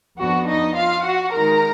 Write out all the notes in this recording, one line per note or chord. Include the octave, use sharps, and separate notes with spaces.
F2 F3 B3 D4 F#4
D#4 D#5
F4 F5
F#4 F#5
D#3 G#3 D#4 A#4 A#5